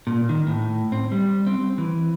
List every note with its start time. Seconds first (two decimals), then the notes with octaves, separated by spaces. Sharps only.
0.07 A#2
0.29 D#3
0.47 A2
0.92 C4
1.12 G3
1.47 C4
1.78 E3